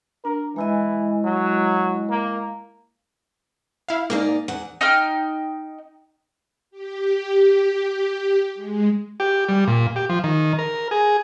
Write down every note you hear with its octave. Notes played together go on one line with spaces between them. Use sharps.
D4 A#4
E3 G#3 E4 D#5
F#3
A#3
E4 F5
G#2 A#3 D#4 D5
E2 F#5
D#4 G5 F6
G4
G#3
G4
G3
A#2
G4
F3
D#3
A#4
G#4